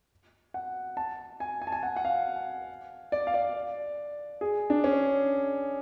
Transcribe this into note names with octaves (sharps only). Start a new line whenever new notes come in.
F#5
A5
G#5
G#5
A5
G#5
F#5
F#5
F5
D5
F5
D5
G#4
D4
C#4